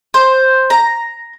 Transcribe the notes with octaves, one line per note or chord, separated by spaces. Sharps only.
C5
A#5